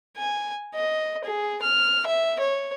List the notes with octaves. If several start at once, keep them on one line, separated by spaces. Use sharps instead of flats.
G#5
D#5
G#4
F6
E5
C#5